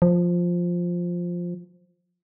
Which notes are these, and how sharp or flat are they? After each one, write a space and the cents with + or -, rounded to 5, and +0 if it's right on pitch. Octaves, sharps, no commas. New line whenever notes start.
F3 +5